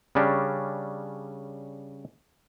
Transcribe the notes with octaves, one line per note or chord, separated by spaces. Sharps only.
C#3 G3 C#4 D4